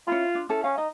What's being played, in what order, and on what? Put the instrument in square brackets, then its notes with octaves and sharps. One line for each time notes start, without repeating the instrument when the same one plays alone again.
[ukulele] C#4 E4 B5 [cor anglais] F4
[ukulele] D4
C#4 E4 A4
[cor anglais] C#4 [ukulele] F5
[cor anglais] D#4 [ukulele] D#5